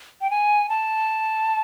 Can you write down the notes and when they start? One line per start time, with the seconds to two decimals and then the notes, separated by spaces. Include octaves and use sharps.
0.21 G5
0.30 G#5
0.69 A5